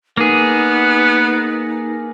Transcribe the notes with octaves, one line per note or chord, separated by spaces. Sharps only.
A#3 B3 D#4 G#4